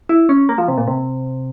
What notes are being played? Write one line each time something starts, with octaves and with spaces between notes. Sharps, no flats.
E4
C#4
A#3
F3
C3
A#2
C3